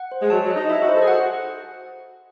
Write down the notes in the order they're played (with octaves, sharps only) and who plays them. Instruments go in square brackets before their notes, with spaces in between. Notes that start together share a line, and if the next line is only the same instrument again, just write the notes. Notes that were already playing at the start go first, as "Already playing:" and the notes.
Already playing: [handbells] F#5
C5
[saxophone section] G#3
[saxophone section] F#3 [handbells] A5
[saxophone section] F#3
[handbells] D#5
[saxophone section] D#4
[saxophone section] E4 [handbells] D#5
[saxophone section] F#4
[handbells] C5
[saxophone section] A4
G#4
[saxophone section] F#4 [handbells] F#5